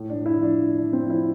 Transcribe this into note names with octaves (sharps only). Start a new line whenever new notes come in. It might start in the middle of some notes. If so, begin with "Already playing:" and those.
Already playing: A2
D4
A2
E4
F3
D4
A2
D4
F3
C4
F3
E4